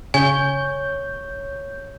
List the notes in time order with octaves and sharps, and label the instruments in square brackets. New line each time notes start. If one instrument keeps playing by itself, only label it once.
[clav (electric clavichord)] C#3 [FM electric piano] C#5 G6 [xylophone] G#5